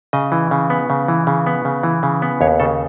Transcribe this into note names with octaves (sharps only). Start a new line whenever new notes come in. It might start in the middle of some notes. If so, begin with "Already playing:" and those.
C#3 D#5
E3
C#3
B3
C#3
E3
C#3
B3
C#3
E3
C#3
B3
D#2 C#5
C#3 A4